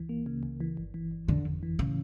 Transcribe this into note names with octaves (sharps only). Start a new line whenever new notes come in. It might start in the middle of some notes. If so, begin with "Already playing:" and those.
Already playing: C#2 E3
A#3
C#3
C#2
E3
G1
E3
G1
F2 D3
G1
E3
A2 C#3